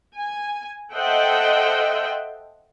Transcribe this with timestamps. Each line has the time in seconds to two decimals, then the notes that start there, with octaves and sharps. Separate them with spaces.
0.16 G#5
0.93 A4 C5 D#5 E5 F#5 G5